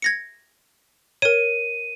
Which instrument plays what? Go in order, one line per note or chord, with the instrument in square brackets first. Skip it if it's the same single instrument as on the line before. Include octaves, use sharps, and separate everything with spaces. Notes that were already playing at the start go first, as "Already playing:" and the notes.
[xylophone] G#6 A#6 C#7
[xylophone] A#4 C#5 [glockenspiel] D#7